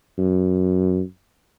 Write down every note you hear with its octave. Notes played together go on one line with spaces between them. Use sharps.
F#2